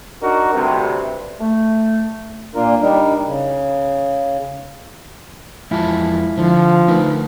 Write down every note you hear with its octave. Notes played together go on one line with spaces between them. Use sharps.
D4 D#4 F#4 A#4
D2 G2 C3
A3
A#2 A#3 D4 F4 A#4
G3 D4 D#4 A#4
C#3
F2 E3 G#3 E4 F4 A5
D3 F3
D3 A3 D#4 A#4 B4